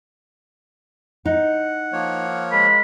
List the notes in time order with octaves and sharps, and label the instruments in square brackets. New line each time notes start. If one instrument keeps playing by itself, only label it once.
[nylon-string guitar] D#4 [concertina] F#5
[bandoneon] F3 A#3 C#5
[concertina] G#3 A#4 [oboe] B5